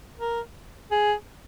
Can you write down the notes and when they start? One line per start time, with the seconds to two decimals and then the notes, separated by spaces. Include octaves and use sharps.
0.19 A#4
0.91 G#4